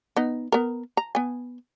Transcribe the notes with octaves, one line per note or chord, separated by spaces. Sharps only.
B3 D#4
B3 A#4
A#5
B3 G#5